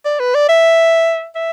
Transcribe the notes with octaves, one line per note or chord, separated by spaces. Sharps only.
D5
B4
D5
E5
E5